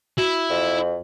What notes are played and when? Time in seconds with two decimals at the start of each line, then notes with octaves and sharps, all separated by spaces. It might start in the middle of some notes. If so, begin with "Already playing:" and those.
0.18 E4 F#4
0.50 F2